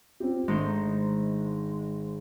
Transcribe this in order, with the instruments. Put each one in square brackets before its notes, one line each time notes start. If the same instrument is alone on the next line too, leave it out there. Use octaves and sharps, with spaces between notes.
[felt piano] C4 F4 G4
[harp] G#1 D#4 C5 [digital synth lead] G#3 [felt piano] A3 D4